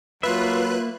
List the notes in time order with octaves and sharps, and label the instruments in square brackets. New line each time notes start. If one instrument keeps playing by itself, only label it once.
[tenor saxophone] F#3 [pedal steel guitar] A#3 E5 [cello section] F4 [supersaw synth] B4 F#6